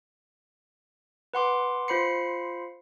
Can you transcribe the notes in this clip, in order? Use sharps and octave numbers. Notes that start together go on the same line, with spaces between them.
B4 F#5 C6 D6
F4 C5 B5 C7 C#7